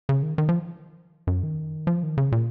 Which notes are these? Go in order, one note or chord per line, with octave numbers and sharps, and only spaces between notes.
C#3
D#3
D#3
F3
F#2
D#3
F3
D#3
C#3
A#2